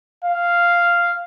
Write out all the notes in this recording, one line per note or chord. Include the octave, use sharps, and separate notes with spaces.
F5